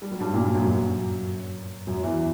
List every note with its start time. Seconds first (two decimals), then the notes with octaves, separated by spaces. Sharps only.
0.02 G3
0.12 F#3
0.20 G2 G3
0.33 A#2 A#3
0.44 G2 G3
0.54 F#2 F#3
0.64 F#2 F#3
1.87 F#2 F#3
2.03 E2 E3